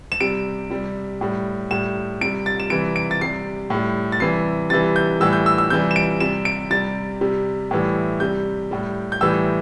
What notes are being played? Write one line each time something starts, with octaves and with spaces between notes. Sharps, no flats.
E7
C3 G3 D7
C3 G3
A2 G3
A2 G3 E7
C3 G3 D7
A6
E7
C3 E3 G3 D7
D7
A6
C3 G3 C7
A2 G3
A6
C3 E3 G3 C7
C3 E3 G3 A6
G6
A2 E3 G3 E6
G6
E6
E6
C3 E3 G3 G6
E7
D7
C3 G3 E7
D7
C3 G3 A6
C3 G3
A2 E3 G3
C3 G3 G6
A2 G3
G6
A2 E3 G3 E6